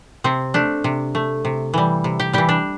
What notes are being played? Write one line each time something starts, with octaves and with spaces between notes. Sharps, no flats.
C3 C4
A3 D4
C3
A3
C3
E3 G3
C3
G4
E3 G3 G4
D4